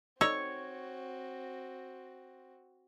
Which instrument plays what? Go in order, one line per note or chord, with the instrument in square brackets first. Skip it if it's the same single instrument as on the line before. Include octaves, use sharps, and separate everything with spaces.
[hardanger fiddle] C4 F#4 [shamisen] D#4 A4 D5 [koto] C#5 [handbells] E6